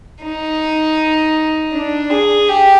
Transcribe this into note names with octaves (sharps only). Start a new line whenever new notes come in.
D#4
D4
G#4
G4